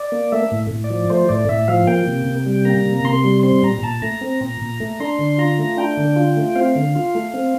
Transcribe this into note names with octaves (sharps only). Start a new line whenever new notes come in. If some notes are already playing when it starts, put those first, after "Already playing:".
Already playing: D5
A#3
A3 E5
A2
A2
D5
F3
A3 C5
A2 D5
A2 E5
F3 F5
A#3 G5
C3
C3
G3
A#3 A#5
C3
C3 C6
G3
C4 C6
A#2 A#5
A#2 A5
A3 A#5
C4
A#2
A#2
A3
D4 C6
D3
F4 A#5
A3
D4 G5
D3
F4
A3
C4 F5
D3
F4
A3
C4